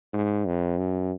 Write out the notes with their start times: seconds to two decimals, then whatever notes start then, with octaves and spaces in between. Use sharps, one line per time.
0.13 G#2
0.46 F2
0.78 F#2